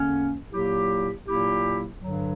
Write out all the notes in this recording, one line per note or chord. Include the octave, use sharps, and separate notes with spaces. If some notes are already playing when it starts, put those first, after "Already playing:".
Already playing: E2 D3 A#3 C#4
A#2 F#3 A#3 E4 G4
A#2 F#3 A#3 E4 G4
G2 D3 F#3